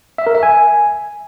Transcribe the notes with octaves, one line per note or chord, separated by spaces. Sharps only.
E5
A#4
E5
G#5